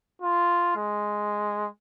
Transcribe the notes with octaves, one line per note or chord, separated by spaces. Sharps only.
F4
G#3